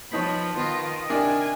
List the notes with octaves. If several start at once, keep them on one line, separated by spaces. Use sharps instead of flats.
F3 B3 D#4 C#5 A5 B5 G6 B6
D#3 B3 F4
C3 D4 A#4 D5 D#5 G#5